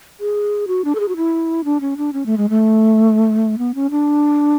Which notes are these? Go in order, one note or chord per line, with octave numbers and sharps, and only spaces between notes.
G#4
F#4
D4
A4
G#4
F#4
E4
D4
C#4
D4
C#4
A3
G#3
A3
B3
C#4
D4